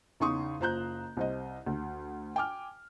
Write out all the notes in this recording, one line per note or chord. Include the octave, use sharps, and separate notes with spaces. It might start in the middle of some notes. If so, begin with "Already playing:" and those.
E2 C#3 D#4 C6 C#6 D#6
F#1 F4 C5 A#5 F#6 G6
C2 C4 D#5
D2
G5 G#5 D6 F6